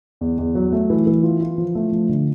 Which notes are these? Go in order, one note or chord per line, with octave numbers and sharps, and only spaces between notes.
E2
E2
F#3
A3
E3
E3
F4
F4
F3
A3
F3
D3